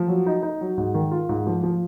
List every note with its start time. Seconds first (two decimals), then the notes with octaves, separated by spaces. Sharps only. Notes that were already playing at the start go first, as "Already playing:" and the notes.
Already playing: F3
0.08 F#3
0.26 D#4
0.43 D#4
0.61 F#3
0.78 G#2
0.94 D#3
1.11 F4
1.29 G#2
1.47 F3
1.63 F3